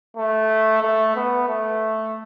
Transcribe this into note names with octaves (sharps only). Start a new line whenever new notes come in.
A3
A3
B3
A3